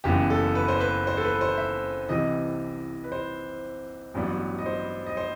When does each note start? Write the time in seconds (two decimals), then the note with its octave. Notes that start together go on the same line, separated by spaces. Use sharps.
0.04 F#1 F#2 E3 B3 G4
0.30 A4
0.55 B4
0.68 C5
0.81 B4
1.07 C5
1.17 A4
1.25 B4
1.41 C5
1.58 E5
2.09 C2 C3 E3 D#5
3.04 B4
3.12 C5
4.14 A1 G2 F#3 B3
4.58 D#5
4.66 C5
5.06 D#5
5.17 C5